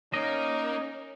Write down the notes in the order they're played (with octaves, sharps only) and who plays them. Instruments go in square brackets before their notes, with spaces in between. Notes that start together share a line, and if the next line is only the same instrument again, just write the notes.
[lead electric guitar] A#3 [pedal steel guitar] C#4 D#5 [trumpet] D#4 [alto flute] C#5